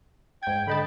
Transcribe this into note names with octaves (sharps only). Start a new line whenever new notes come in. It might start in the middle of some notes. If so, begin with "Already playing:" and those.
G#2 G5 G#6
D3 D#4 A5 B5